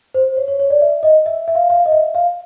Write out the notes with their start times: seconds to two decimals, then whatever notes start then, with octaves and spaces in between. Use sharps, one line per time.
0.14 C5
0.37 C#5
0.48 C#5
0.60 C#5
0.70 D5
0.81 E5
1.03 D#5
1.26 E5
1.48 E5
1.55 F5
1.70 F5
1.86 D#5
1.92 E5
2.15 F5